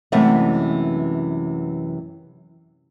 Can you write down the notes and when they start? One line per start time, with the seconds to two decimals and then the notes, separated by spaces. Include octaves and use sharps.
0.12 F#2 C3 E3 G#3 A3 B3